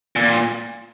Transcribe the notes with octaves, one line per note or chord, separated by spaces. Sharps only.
A#2